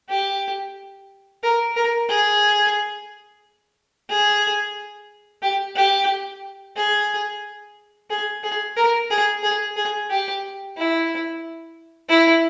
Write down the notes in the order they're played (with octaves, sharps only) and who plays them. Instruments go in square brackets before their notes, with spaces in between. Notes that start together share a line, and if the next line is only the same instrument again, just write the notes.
[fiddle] G4
A#4
A#4
G#4
G#4
G4
G4
G#4
G#4
G#4
A#4
G#4
G#4
G#4
G4
E4
E4